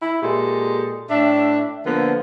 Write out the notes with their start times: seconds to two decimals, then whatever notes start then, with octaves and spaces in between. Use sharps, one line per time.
0.02 E4
0.22 A#2 G#3 G4 A4
1.10 A2 D4 E5
1.85 D3 F3 A#3 B3